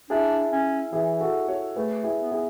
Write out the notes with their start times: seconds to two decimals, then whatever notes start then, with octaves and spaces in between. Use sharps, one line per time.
0.10 D4 E4 G#4
0.51 C#4
0.92 E3 E4 G#4
1.21 F#4 A4
1.48 A4 C#5
1.76 A3 G#4 B4
2.03 E4 G#4
2.17 B3
2.31 E4 G#4